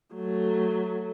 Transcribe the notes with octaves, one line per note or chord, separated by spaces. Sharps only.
F#3 A3